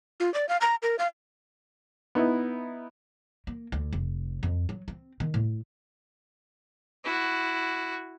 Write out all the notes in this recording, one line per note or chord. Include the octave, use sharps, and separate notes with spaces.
F4
D5
F5
A#5
A#4
F5
B3 D#4 E4
A#3
D2
F1
F2
F#3
C4
D#3
A2
E4 F#4